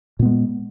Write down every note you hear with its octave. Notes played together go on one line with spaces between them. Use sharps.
A#2 G#3 B3